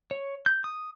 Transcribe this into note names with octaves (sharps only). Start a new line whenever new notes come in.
C#5
G6
D#6